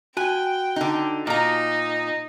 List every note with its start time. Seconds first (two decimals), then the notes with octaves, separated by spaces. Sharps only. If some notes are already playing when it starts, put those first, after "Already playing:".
0.17 F#4 G5 G#5 F#6
0.76 D3 D#4
1.27 A#2 D#4 A#5